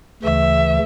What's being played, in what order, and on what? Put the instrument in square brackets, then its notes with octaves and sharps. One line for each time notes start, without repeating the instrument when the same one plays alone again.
[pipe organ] D2 C#3 E3 A3 [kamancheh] E5